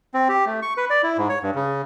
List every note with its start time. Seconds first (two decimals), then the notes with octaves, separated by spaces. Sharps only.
0.14 C4
0.29 G4
0.46 A3
0.62 C#6
0.77 B4
0.90 D5
1.03 E4
1.18 G#2
1.30 C#5
1.43 G2
1.55 C#3